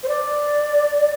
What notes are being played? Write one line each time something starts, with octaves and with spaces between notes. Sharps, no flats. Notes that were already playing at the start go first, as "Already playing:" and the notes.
C5
D5